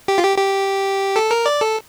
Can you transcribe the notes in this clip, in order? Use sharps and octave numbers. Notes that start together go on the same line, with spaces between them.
G4
F4
G4
G4
A4
A#4
D5
A4